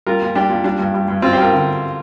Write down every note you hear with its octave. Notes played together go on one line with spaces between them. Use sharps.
G3 F4 A#4
A#2
G3 D4 G4
A#2
G3 D4
G2
G3
G2
G2 C4 F4
G4 C5
G3 F4 A#4
D3